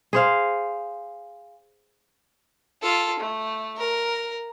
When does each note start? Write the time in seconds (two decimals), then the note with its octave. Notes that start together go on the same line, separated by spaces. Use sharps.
0.13 G#4 C5 F5
2.82 F4 A4
3.20 A3
3.77 A#4